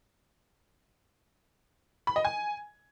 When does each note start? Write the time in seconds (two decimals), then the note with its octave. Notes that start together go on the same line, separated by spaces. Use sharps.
2.07 B5
2.16 D#5
2.25 G#5